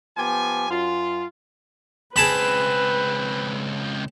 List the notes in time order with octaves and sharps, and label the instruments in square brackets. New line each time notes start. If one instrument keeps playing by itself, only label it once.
[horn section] F3 B3 G4 G#5
F#2 F4
[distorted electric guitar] C#2 C4 [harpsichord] G#4 A5 B5 [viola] B4